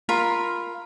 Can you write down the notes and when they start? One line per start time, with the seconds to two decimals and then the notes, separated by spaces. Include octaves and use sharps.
0.09 F4 A#4 B5